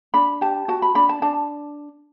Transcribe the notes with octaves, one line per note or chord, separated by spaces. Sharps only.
D4 B5
G4 A5
F#4 A5
B5
D4 B5
A5
D4 A5